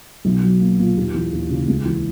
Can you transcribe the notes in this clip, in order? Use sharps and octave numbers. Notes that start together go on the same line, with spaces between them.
B1
F#3
A#3
A#2
D#2
E3
D#2
C#3
C#2
E3